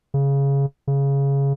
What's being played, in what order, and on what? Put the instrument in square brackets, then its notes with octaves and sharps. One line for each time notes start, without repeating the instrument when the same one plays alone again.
[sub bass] C#3
C#3